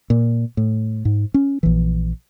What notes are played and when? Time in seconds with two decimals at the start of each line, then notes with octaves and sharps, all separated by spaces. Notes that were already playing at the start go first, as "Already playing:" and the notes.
0.10 A#2
0.57 A2
1.05 G#2
1.34 C#4
1.63 A#1 E3